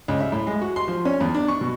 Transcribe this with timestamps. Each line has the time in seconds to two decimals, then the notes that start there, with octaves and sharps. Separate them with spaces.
0.08 C#2
0.21 E5
0.32 A2
0.47 G#3
0.61 F#4
0.76 C6
0.88 F3
1.05 C#4
1.20 E2
1.34 D4
1.48 C#6
1.61 B2